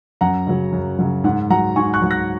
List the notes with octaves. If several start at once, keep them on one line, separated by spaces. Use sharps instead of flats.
F#2 F#5 A#5
C#3 F#3
F#2
C#3 F#3
G#2 F#5
F#3 F#5 A#5
G#2 G#5 C#6
C#6 F#6
F#3
F#6 A#6